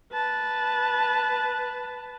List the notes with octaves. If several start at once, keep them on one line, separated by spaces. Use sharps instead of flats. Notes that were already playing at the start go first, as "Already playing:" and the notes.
B4 A5